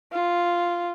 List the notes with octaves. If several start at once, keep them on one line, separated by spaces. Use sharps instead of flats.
F4